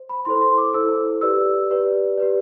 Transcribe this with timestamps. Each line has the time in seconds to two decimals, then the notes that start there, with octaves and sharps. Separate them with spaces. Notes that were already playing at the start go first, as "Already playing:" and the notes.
Already playing: C5
0.09 B5
0.25 E4 A4 C5 C6
0.41 C6
0.58 D6
0.73 E4 A4 C5 E6
1.21 G4 B4 D5 E6
1.70 G4 B4 D5
2.17 G4 B4 D5